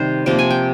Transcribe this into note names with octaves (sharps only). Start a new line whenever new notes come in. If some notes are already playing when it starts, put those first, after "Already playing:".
Already playing: C3 D#3 G3 C5
C3 F3 A#3 G5
G#5
G5